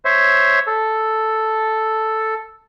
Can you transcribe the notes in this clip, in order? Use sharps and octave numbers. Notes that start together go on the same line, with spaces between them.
C5 C#5 E5
A4